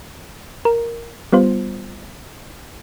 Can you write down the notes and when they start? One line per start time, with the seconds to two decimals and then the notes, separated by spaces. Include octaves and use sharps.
0.65 A#4
1.33 G3 B3 F4 C5